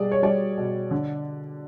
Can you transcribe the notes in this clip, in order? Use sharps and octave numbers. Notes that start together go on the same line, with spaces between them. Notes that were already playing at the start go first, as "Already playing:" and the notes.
Already playing: B2 G3 G#4 D5
C#5
G3 D5
B2
D3